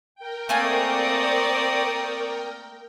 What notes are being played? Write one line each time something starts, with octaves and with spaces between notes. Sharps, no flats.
A#4 G5
A3 A#3 C4 D5 G#5 A#5 C#6 D#6